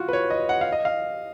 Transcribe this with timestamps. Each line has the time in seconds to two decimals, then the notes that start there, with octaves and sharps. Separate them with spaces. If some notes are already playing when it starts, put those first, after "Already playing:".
Already playing: F4 F#4
0.08 B4
0.13 C#5
0.30 D#5
0.49 F#5
0.61 F5
0.72 D#5
0.85 F5